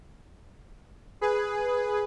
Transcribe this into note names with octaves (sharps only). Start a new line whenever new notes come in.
G#4 B4